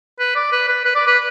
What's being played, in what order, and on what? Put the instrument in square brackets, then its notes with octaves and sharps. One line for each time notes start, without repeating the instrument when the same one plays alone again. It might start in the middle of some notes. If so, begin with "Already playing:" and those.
[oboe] B4
D5
B4
B4
B4
D5
B4